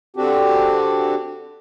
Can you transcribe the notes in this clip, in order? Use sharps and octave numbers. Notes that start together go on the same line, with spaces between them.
D3 C4 D4 F#4 G4